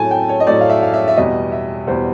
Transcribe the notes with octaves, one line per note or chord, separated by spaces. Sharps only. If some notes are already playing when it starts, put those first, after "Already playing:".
Already playing: A2 F#3 G#5 A5
G5
C#5
D#5
A2 F#3 D5
F5
E5
F5
E5
E5
E2 B2 G3 D#5
E5
E2 B2 G3 C5